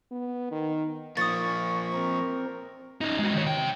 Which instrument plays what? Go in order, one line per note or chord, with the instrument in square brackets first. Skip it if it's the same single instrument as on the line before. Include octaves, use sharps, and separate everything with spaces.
[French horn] B3
D#3
[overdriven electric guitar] F3 A#3 [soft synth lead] C#6 [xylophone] D#6 A6
[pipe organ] C4 A#4
[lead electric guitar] C#4 D#4
G#3 F#4
D#3 C#5
C3 G5